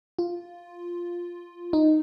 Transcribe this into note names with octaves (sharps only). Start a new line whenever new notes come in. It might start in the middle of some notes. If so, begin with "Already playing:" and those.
F4
D#4